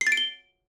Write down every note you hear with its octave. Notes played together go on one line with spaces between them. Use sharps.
C7
A6
D7
G7